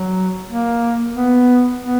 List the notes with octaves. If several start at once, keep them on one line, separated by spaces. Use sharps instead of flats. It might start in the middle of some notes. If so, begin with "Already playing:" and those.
Already playing: F#3
A#3
B3
B3